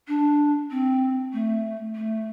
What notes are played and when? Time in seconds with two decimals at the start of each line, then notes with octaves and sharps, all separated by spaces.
0.08 D4
0.71 C4
1.33 A3
1.95 A3